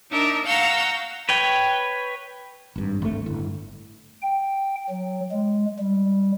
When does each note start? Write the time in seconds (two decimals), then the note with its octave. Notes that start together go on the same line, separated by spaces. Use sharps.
0.11 D4 D#4 A#4 E5
0.46 F5 F#5 A#5 C#6 E6 G6
1.29 B4 C#5 G5
2.76 G#1 G2
3.02 G#1 D2 A3
3.26 G1 A2
4.22 G5
4.89 F#3
5.32 G#3
5.79 G3